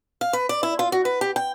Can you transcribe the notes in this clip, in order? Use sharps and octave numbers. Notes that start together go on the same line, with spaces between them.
F5
B4
D5
E4
F4
F#4
B4
G4
G5